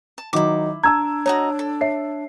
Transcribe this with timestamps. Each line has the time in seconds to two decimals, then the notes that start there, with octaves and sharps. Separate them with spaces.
0.18 A5
0.33 D#3 F#3 D#4 E4 D6
0.84 D4 A5 A#5 E6 G#6
1.26 F#4 C#5 D#5 A#5
1.59 A4
1.81 C#5 E5 C7